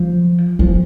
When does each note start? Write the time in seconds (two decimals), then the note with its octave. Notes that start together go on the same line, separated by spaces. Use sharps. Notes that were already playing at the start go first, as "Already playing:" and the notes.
Already playing: F3
0.59 F3